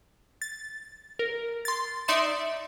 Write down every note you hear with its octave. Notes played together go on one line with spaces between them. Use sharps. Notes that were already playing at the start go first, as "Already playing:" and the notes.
A6
A#4
C6 A6
D#4 D5 E5 C6 C#7 E7